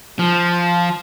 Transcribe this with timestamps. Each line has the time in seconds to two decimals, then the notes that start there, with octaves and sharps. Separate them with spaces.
0.19 F3